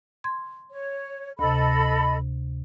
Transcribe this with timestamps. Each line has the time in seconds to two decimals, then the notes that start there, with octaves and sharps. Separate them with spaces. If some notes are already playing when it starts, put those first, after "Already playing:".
0.24 C6 G#6
0.72 C#5
1.39 D2 C3 A4 D#5 B5